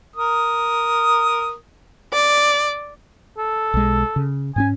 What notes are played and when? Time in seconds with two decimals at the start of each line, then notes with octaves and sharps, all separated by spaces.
0.16 A#4 D#6
2.14 D5
3.38 A4
3.74 B1 G#3
4.16 C#3
4.56 G#2 B3 C#4 G#5